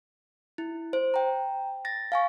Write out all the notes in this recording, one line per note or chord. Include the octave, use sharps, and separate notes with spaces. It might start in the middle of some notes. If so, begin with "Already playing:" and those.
E4
C5
G5 A#5
A6 A#6
F5 G#5 C#6